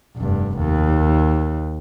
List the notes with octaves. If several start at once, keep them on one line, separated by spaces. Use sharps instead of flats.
F1 G2
D#2